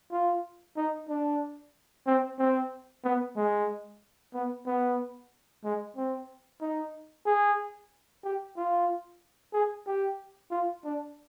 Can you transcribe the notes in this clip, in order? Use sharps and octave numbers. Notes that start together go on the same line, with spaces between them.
F4
D#4
D4
C4
C4
B3
G#3
B3
B3
G#3
C4
D#4
G#4
G4
F4
G#4
G4
F4
D4